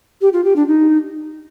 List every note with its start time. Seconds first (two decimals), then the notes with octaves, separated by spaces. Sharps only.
0.21 G4
0.33 F4
0.45 G4
0.56 D4
0.68 D#4